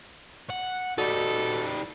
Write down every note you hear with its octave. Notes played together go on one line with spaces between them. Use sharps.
F#5
G3 D#4 F#4 A4 D5